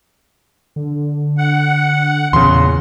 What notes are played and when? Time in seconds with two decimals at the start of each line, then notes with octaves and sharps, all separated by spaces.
0.76 D3
1.38 F#5
2.33 E2 A#2 C#3 C6